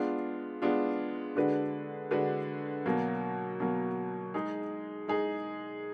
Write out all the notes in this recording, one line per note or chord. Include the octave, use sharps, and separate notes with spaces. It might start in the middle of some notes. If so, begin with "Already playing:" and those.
Already playing: G#3 B3 D4 F4
G#3 B3 D4 F4
D3 G#3 D4 F#4 B4
D3 G#3 D4 F#4 B4
B2 F#3 A#3
B2 F#3 A#3
G#3 D#4 G#4
G#3 D#4 G#4